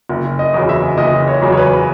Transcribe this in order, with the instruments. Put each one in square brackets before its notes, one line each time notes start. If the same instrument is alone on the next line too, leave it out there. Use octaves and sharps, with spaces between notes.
[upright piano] F#1
D#5
E2 C#3 F#3
E5
F#1 D#5
C#5
E2 C#3 F#3
C#5
B4